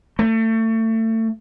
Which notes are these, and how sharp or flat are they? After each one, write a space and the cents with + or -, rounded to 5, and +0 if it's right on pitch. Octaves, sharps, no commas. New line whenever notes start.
A3 +30